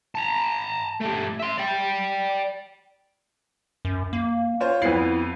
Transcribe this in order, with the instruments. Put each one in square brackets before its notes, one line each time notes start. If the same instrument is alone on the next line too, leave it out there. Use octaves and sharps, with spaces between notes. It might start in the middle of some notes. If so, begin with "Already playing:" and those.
[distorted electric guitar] A5 A#5
A3 G4
E5 C6
D5 G5
[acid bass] F#2
A#3
[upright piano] F4 C5 C#5
[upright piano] F2 B3 C7 [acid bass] E4